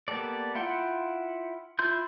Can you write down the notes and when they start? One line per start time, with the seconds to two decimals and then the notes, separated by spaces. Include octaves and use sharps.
0.08 A#3 B3 G4 A4 D5
0.55 E4 F4 F#5 G5 C6
1.79 E4 F4 C6 G6